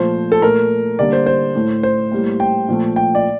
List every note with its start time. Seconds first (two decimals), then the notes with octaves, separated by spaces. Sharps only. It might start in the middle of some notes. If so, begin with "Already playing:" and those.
Already playing: A#2 F3 A3 C5
0.32 A4
0.42 A#2 A3 A#4
0.99 D3 G3 A#3 D5
1.13 C5
1.26 C5
1.55 A2 A3
1.83 C5
2.12 A2 G3 A#3
2.40 G5
2.68 A#2 F3 A3
2.96 G5
3.15 D5